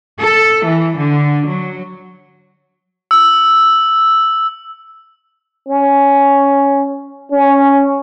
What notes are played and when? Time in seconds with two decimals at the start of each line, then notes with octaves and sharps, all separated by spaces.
0.20 A4
0.65 E3
0.97 D3
1.46 F#3
3.11 E6
5.69 C#4
7.32 C#4